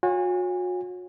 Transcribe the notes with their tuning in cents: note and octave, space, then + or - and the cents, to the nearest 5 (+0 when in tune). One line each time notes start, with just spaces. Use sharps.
F#4 -40 C#5 +0 G#5 -30